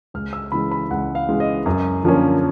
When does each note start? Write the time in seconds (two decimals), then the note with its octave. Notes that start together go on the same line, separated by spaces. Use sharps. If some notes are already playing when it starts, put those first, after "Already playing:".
0.14 C#2 F6
0.33 E6
0.52 C#3 E3 G#3 B5
0.71 B5
0.91 C#2 F#5
1.15 F5
1.29 C#3 E3 G#3
1.40 D#5
1.66 F#2
2.04 D3 F3 A#3 C#4